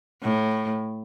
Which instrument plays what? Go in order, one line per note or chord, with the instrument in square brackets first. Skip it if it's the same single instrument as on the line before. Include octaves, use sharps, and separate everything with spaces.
[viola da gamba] A2